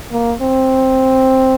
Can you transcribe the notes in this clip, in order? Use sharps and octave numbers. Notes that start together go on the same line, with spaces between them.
A#3
C4